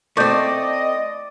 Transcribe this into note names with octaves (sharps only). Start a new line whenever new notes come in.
A3 C4 D5 D#5 C#6 G6